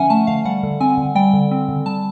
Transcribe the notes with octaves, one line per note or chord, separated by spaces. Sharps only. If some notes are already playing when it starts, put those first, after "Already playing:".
Already playing: D3 F3 C#4 E5 F#5 G#5
A3 A5
D3 F5
G3 F#5
D3
C4 G#5
D3
G3 G5
D3
C4
D3
G3 A5